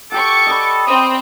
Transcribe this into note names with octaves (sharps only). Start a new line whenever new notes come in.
G4 A4 F#5 C#6 D6
B4 D5 D#5
C4 G5 D#6